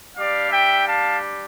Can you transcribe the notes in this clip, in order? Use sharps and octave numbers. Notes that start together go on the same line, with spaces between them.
G3 D4 G4 D5 F5
E5 G5
F5 A5